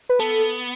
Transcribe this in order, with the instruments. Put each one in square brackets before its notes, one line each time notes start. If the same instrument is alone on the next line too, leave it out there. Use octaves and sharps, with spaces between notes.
[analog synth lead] B4
[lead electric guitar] B3 [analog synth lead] A4